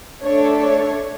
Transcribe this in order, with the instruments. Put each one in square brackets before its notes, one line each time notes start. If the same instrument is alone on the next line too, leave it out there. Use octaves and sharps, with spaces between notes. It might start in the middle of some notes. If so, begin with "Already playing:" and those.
[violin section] A3 D4 A4 C#5
C#5